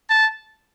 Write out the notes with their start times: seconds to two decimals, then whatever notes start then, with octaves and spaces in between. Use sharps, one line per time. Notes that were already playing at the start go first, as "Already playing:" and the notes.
0.09 A5